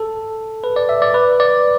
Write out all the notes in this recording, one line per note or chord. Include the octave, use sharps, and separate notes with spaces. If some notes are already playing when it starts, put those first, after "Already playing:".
Already playing: A4
B4
D5
E5
D5
B4
D5